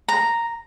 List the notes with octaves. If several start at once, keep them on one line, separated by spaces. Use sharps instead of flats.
A#5